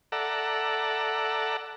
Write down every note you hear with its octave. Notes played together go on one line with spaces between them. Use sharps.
A4 D5 E5 F#5 A#5